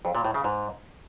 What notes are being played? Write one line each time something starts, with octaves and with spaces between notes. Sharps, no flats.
F2
A#2
A2
C#3
G#2